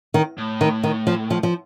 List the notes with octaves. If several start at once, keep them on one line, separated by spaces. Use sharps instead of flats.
D#3
A2
D#3
D#3
F3
F3
F3